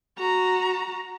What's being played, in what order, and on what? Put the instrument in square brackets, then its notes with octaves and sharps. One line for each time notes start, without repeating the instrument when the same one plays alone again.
[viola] F#4 A#5